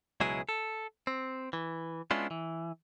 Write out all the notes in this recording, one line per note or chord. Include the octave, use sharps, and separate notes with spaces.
C#2 B2 F#3 G#3 E4 G#4
A4
C4
E3
G#3 B3 C#4 D4 E4 F4
E3